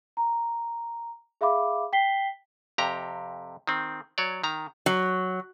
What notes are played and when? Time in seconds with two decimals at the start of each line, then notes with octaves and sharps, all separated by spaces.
0.17 A#5
1.41 G#4 E5 F5 B5 D6
1.93 G5 B6 C7 G7
2.78 F2 C3 G4 A#5
3.67 D#3 C4
4.18 F#3 C#5 D5
4.44 D#3 A#5
4.86 F#3